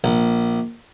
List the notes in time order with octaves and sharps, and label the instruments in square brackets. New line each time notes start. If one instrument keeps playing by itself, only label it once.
[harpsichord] A#1